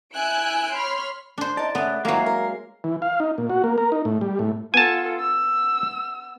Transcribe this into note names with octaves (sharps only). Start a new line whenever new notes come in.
E4 G#5 E6 F#6 G6 D7
C#5 B5 C6 F6
D4 C5
D#4 D5 A5
C#3 A3 B3
F2 E3 F#3 G#3 A#3 F5
A#4
E3
F5
D#4
A#2
F#4
A#3
A#4
D#4
A2
G3
A2
B3 F4 A4 G#5 A5
E6